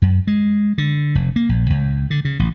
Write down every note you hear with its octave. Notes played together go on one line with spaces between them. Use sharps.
F#2
G#3
D3
F1
A#3
A#1
C#2
D3
C#3
A1